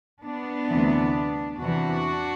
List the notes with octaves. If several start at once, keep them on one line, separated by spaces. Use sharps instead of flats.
B3 D4
D2 C3 E3
E2 C3 E3 D4 F#4